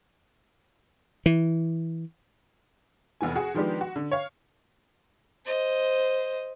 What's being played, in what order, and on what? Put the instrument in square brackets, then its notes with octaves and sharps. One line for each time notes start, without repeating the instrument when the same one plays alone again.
[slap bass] E3
[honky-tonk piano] F1 E2 E3 G#5
F#4 G#4
D#3 F3 G#3 B3 D4 G4
F#4
D3
C#5 F5
[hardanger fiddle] C5 D#5